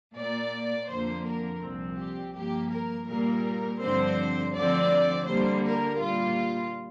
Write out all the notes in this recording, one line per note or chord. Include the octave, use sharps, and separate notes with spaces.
A#2 A#3 D5
F2 D3 F3 A#3 C5
A#4
C2 A#2 F3 C4
G4
G2 F3 A#3 G4
A#4
A#2 G3 A#3 A#4
G2 D3 F3 C4 C5
D2 D3 F3 C4 D5
D2 D3 G3 A#3 C5
A#4
A#2 G3 A#3 F4